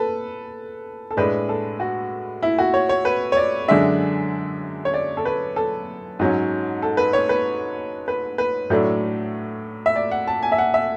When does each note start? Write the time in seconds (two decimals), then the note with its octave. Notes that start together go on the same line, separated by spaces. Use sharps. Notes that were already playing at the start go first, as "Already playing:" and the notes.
Already playing: A4 B4
1.11 A4
1.17 A2 G#3 D4 B4
1.49 A4
1.80 F#4
2.43 E4
2.58 F#4
2.74 C#5
2.89 C#5
3.05 B4
3.32 C#5
3.37 D5
3.68 F#2 D3 G#3 D4 E5
4.85 C#5
4.94 D5
5.17 A4
5.25 B4
5.56 A4
6.19 G#2 F#3 C#4
6.82 A4
6.97 B4
7.13 C#5
7.29 B4
8.08 B4
8.38 B4
8.70 A2 F#3 A3 D4
9.86 E5
9.96 D5
10.11 F#5
10.27 A5
10.43 G#5
10.52 E5
10.58 F#5
10.74 E5